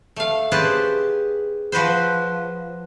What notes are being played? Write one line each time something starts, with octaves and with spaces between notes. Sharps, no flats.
A3 F5
C#4 G4 G#4 B4 C5 A5
F3 F#4 B4 C5